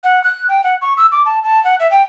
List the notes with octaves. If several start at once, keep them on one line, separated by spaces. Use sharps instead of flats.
F#5
F#6
G5
F#5
C#6
E6
D6
A5
A5
F#5
E5
G5